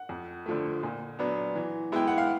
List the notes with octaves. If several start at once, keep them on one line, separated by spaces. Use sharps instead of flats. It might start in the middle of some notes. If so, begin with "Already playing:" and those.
Already playing: F#5
F2
D3 F3 A3
A#2
F#3 B3 D4
E3
G#3 B3 E4 G5
F#5
F5